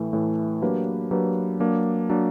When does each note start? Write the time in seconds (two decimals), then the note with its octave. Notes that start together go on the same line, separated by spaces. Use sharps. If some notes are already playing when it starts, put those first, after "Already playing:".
Already playing: A2 E3 A3
0.13 A2 E3 A3
0.62 F#3 A#3 D4 G4 B4
1.11 F#3 A#3 D4 G4 B4
1.60 F#3 A#3 D4
2.10 F#3 A#3 D4